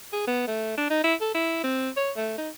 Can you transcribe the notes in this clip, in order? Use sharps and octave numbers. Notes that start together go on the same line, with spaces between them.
G#4
B3
A3
D4
D#4
E4
A4
E4
C4
C#5
A3
D#4